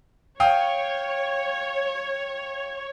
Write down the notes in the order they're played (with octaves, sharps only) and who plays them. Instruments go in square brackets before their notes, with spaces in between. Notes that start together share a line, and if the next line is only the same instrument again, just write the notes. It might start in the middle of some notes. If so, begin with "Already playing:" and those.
[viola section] C#5 [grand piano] F5 G5 D#6